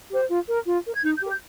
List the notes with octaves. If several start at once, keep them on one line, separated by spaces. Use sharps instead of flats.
G4 C5
F4
A#4
F4
A#4
G#6
D#4 G6
G6
G4 A#4
G6